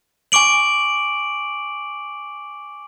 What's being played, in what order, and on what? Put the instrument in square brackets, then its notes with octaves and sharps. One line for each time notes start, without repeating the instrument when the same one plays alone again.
[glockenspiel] G#5 C#6 D6 D7 F#7